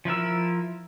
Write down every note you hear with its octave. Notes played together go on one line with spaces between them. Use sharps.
F3 E4 A#4 E6